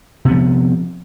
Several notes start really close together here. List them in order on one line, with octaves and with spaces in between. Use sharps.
C3 B3 F3